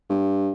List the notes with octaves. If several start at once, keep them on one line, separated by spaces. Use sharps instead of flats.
G2